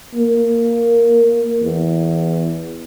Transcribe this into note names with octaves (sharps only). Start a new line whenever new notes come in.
A#3
E2